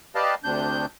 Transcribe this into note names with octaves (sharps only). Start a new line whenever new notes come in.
G4 B4 D5 D#5 F5 A5
D2 C3 D4 G6